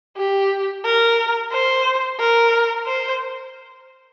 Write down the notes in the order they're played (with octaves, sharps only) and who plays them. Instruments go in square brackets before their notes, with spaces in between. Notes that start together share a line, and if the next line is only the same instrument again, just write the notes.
[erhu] G4
A#4
C5
A#4
C5